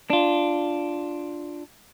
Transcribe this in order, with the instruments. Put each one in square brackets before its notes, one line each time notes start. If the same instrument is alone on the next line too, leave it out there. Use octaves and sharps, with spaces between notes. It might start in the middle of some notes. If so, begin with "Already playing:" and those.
[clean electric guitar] D4 F4